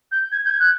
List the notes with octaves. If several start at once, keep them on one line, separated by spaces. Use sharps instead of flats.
G6
G#6
G6
G#6
F#6